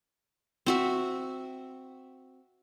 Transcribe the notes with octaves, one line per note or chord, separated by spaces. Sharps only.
C4 F#4 E5